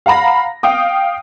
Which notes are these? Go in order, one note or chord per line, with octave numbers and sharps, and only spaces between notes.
F5 F#5 A#5 B5 A#6
F5 G5 D#6